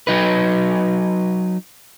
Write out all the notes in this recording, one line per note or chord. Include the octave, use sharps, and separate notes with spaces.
F#3 D#4 B4